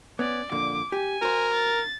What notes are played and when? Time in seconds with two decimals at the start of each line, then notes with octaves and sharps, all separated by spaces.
0.19 B3 C#4 D5
0.52 F2 A#2 D3 D6
0.92 G4 G#5
1.22 F#4 A#4 C5
1.54 A6